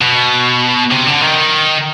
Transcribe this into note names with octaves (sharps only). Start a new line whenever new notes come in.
B2
C3
D3
D#3